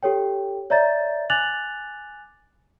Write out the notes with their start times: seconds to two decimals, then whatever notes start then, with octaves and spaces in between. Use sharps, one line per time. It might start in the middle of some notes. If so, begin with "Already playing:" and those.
0.03 G4 A4 C#5 G5
0.70 C#5 D5 E5 A#5 G6 A6
1.30 G#5 D6 F#6 A6 F7 F#7